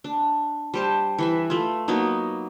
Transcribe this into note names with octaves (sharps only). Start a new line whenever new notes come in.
D4
G3 C5 A5
E3 B4 E5
A3 F4
F#3 A#3 B3 D#4